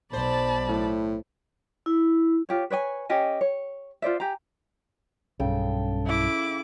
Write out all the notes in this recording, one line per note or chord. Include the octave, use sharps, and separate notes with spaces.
B1 C5 D5 A5 B5
A2
E4
F4 G4 C#5
B4 C#5 D5 G#5
C#4 G4 D#5 G#5
C#5
F4 C5 D5 E5
G4 G#5 A#5
B1 G2 C#3 A4 G5
E4 D6